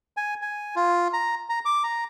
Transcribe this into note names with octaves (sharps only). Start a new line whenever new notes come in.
G#5
G#5
F4
A#5
A#5
D6
A#5